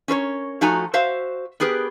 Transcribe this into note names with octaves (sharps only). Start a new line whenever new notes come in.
C#4 A#4 C5 C#5
F3 A3 D#4 F#4 G#5 A#5
F#4 C5 E5 F5
B3 G4 G#4 A#4 B4